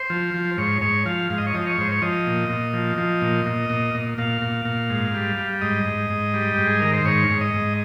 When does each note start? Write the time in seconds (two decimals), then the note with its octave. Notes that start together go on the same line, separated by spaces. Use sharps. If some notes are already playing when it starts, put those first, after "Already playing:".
Already playing: C5
0.10 F3
0.34 F3
0.58 G#2 C#5
0.81 G#2 C#5
1.06 F3 F5
1.30 G#2 F5
1.38 D#5
1.47 C#5
1.54 F3 D#5
1.66 C#5
1.78 G#2 C5
1.92 C#5
2.02 F3 D#5
2.27 A#2
2.49 A#2
2.73 F3
2.98 F3
3.22 A#2
3.46 A#2
3.70 A#2
3.94 A#2
4.18 A#2 F5
4.42 A#2
4.65 A#2
4.90 G#2
5.14 G3
5.37 G3
5.61 G#2 D#5
5.86 G#2
6.10 G#2
6.34 G3
6.55 G#2 G4
6.67 G#4
6.80 D#3 A#4
6.93 C5
7.05 G#2 C#5
7.30 G#2
7.41 D#5
7.54 G#2